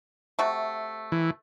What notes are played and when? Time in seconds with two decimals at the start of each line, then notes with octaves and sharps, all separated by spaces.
0.39 C3 A3 F#4
1.12 E3